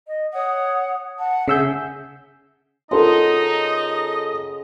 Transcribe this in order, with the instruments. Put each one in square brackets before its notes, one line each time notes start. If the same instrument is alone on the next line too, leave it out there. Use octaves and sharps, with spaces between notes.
[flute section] D#5
C#5 F#5 D#6
F#5 A5
[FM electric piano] C#3 E6 G6 [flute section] G#4 E5 F#5
[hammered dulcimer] C#3 F#5 C6 [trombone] D#4 [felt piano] F4 A4 A#4 [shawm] D#5